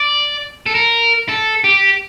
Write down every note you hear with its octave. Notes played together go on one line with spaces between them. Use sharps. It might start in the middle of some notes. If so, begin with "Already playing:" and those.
Already playing: D5
A4
A#4
A4
G4